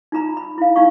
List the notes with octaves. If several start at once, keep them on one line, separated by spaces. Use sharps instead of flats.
D#4 F4 A#5 B5
B5
E4 F5
D#4 F4 F5 C#6